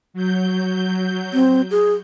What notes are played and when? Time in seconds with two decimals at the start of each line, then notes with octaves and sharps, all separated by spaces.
0.14 F#3 G6
1.33 C4
1.71 G#4